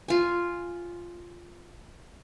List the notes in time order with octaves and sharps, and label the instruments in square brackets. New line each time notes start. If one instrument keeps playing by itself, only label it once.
[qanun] F4 G#5